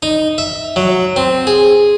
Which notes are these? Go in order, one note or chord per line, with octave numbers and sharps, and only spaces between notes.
D#4
E5
F#3
C4
G#4